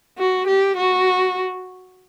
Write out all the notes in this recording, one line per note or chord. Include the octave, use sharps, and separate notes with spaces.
F#4
G4
F#4